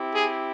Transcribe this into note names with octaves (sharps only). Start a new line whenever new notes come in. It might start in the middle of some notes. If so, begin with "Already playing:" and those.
Already playing: C4 E4 G4
G#4